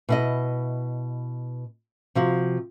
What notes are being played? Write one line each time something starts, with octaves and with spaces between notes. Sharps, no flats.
B2 E4 D#5
C3 F3 F#4